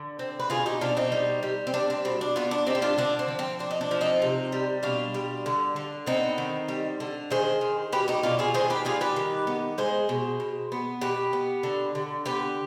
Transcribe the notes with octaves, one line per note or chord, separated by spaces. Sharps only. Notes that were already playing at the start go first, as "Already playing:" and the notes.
Already playing: D3
C4
B4
B2 F4 G#4
D#4 G4
B2 D4 F4
C4 D#4
G3
G3
C4
G3 D4
C4
B2 C4
D4
B3 D4 F4
D4
G3 C4 D#4
G4
D4 F4
D3 D4
C4
F3
C4
C4 D4
D#4
D4
F3
C4 D#4
C3
G3
B2 D4 F4
G3
D3
D3
B3 C4 D#4
D#3
G3
D3
D#3 G#4 C5
D#3
B2 G4 B4
D#4 G4
B2 D4 F4
F4 G#4
D#3 G#4 C5
G4 B4
G3 F4 G#4
G4 B4
D#3
B3
G#3 G#4 C5
B2
B2
B3
B2 G4 B4
B3
D3
D3
B3 G4 B4